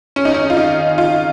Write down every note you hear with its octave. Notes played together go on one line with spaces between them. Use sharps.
C#4
D#4
C#4
F4
D#4
F4